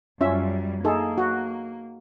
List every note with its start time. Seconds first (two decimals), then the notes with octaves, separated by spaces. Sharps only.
0.21 F#2 G3 C#4 F4 E5
0.84 A#3 D#4 G#4 A4
1.18 F#4